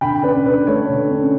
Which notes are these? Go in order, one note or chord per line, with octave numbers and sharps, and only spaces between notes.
D3 G5 B5
C#4 B4 D5
D3 B4
A3 C#5
D3
C#4